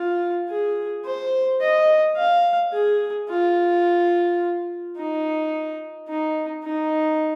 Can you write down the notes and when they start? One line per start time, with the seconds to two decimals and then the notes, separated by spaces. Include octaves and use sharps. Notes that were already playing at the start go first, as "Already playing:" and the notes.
Already playing: F4
0.50 G#4
1.05 C5
1.61 D#5
2.17 F5
2.73 G#4
3.29 F4
4.97 D#4
6.09 D#4
6.64 D#4